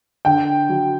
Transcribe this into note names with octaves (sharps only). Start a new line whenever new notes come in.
D3 G5
F#3